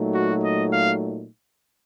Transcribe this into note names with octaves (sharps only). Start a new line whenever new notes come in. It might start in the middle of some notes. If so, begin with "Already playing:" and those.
Already playing: A#2 F#3 A3 D#4
F#4
D#5
F5